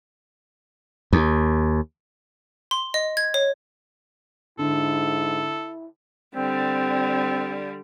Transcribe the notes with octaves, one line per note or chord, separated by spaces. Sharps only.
D#2
C6
D#5
G#6
C#5
G#2 D3 E4 A4
D3 G3 C4